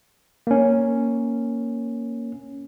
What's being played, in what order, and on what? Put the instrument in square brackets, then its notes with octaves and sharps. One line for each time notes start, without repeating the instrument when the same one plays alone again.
[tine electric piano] A#3 C#4